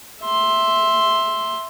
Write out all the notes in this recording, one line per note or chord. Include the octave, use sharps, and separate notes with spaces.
E5 C6